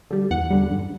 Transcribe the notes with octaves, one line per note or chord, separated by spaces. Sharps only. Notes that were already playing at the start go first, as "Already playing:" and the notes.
D3 G3
E2 F#5
D3 G3
G2